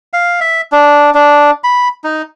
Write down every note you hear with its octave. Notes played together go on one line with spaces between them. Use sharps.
F5
E5
D4
D4
B5
D#4